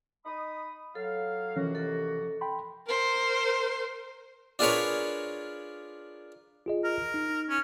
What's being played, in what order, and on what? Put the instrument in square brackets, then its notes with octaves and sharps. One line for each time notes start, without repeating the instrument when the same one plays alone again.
[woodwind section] D#4 B5 D#6
[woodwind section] F#3 F5 [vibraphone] A4
[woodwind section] D#2 C3 F#4 [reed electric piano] E3 F3 C#4
[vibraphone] A4
[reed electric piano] G5 B5 C6
[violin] A#4 C5
[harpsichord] D4 F4 G#4 A#4 B4 C#5
[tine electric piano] F4 G#4 D#5
[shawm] A#4
[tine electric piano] D#4
[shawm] C#4